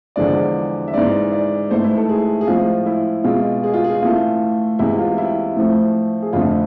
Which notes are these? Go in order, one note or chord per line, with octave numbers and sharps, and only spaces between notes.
E2 D3 F3 G#3 D5
E5
G#2 E3 G#3 D5
D5
G#2 E3 A3 C5
E4
A4
G#4
G#4
A2 F3 G#3 F4
E4
B2 G#3 F4
G#4
F4
G#4
A2 E3 A3 F4
E2 C3 G#3 E4
F4
E4
A2 F3 A3
G#4
F2 D3 A3 F4